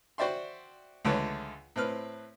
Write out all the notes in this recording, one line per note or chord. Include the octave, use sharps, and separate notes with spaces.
F#4 C5 D5 E5 G5 C6
C#2 D3 A3 B4 C#5
A2 C4 B4 F6